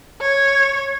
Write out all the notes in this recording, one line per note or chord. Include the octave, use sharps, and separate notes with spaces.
C#5